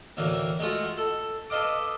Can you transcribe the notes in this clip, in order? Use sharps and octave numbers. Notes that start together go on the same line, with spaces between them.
D2 A2 E3 A#3
G#3 A3 F4 F#4
A4
A4 B4 D#5 F5 D6